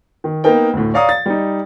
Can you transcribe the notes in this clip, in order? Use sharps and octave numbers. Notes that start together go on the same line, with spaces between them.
D#3
A#3 B3 D#4 A#4 G5
D2 A2
C#5 D5 F5 A#5 D#6
A6
G3 D#4